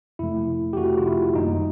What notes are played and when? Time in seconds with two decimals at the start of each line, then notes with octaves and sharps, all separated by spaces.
0.19 F2 C3 F3 A3 E4
0.73 G4
0.77 F2 C3 F3 A3 F#4
0.98 F4
1.06 E4
1.35 F#2 D#3 G3 A#3 D#4